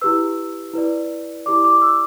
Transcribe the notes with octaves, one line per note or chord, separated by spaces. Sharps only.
E4 G4 B4 E6
E4 B4 D5
E4 G4 D5 D6
D6
E6